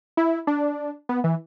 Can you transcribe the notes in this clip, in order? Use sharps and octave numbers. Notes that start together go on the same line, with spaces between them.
E4
D4
B3
E3